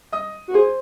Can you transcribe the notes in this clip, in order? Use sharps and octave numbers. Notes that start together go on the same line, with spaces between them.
D#5 D#6
F#4
G#4 C5 C6